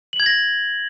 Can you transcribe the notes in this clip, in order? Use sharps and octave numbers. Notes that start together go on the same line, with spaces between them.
F#7
G#6
A#6